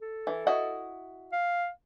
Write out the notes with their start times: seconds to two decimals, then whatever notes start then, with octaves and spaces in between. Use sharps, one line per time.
0.02 A4
0.27 E3
0.47 E4 F#4 D#5
1.32 F5